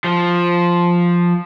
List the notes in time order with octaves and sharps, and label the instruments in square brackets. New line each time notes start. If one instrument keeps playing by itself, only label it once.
[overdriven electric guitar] F3